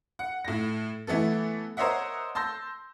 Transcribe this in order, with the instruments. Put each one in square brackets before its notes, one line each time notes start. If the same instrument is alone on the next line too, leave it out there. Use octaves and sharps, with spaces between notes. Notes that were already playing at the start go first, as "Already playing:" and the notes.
[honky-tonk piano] F#5
A2 A#6
E3 A3 B3 A4
A#4 C5 C#5 D#5 E5 F#5
A5 C6 E6 G6 A#6